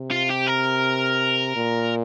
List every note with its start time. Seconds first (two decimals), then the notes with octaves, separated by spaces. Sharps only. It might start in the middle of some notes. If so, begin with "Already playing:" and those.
Already playing: C3
0.11 F4
0.30 G4
0.48 A#4
1.56 A#2